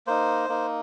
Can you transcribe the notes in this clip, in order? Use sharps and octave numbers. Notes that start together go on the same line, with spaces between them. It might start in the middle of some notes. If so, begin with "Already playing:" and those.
A#3 D#4 C5
A#3 D#4